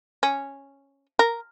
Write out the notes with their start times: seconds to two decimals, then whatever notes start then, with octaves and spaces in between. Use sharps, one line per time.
0.23 C#4
1.19 A#4